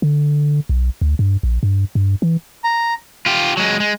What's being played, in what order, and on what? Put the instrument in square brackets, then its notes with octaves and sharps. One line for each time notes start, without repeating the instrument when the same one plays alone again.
[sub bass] D3
B1
D2
G2
A#1
G2
G2
E3
[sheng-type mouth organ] A#5
[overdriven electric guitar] F4 G4
F#3 G#3
G#3